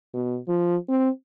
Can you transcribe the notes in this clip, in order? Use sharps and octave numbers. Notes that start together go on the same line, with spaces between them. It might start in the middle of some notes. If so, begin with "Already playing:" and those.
B2
F3
C4